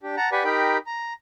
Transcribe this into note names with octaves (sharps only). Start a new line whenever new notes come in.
D4 G4
F#5 A5 A#5
G4 B4 D5 F#5 G#5 B5
D#4 G4 A#4 G5 B5
A#5